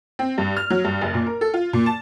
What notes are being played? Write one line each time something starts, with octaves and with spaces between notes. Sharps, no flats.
C4
G2
F6
F#3
G2
F#1
A#2
A#4
A4
F4
A#2
A5